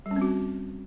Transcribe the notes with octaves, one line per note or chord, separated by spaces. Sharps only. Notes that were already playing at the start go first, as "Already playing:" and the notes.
G3
C#4
C4
F#4